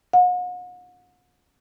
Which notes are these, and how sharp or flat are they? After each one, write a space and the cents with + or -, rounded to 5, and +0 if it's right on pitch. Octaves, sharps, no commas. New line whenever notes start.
F#5 -40